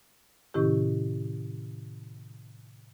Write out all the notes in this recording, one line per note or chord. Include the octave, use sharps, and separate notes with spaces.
A2 C3 D#3 C#4 E4 G4